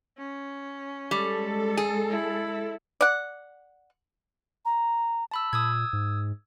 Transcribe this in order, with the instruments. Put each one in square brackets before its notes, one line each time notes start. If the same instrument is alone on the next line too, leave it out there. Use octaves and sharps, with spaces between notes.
[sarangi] C#4
[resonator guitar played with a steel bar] G3 [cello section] G#3 A4
[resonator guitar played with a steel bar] G#4
[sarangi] E4
[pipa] D5 F#5
[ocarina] A#5
[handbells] A5 B5 E6
[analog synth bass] A#2 [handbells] D#6 E6 G#6
[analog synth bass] G#2